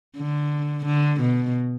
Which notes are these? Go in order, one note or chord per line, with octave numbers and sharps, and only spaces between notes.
D3
D3
B2